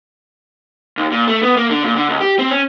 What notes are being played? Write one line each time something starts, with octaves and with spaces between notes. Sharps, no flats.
D#2
A#2
A3
B3
A#3
D3
A#2
D3
C#2
G4
C4
C#4